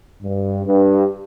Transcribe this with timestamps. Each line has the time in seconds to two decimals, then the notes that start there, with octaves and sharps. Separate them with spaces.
0.23 G2
0.66 G2